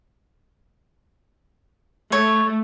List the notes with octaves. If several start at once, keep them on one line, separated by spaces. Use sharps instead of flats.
A3 C#5